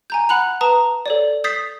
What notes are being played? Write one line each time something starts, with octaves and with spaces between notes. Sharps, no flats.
G#5 A#5 G6
F#5 B5 F#6 F7
B4 A5 A#5 D#6
A4 C#5 D5
D#6 G6 A6 B6 C7